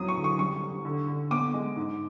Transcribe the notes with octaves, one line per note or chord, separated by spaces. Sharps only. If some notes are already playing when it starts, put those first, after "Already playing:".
Already playing: E2 F#3 D#6
C#6
D3
C#6
G3 C#6
G3
D3
D3
B3 D6
G#3
G#2